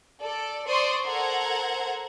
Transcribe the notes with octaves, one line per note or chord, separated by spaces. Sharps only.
A4 D5
C5 D5 C6 C#6 D#6
A4 A#4 C5 F#5 A#5 G#6